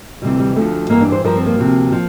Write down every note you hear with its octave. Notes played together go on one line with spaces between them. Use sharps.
D2 C3 E3 G3
G3
D2 D3 F3 A3
G2 E3 A#3
D4
C5
G2 F3 A#4
C4
A#3
D2 C3 F3
F3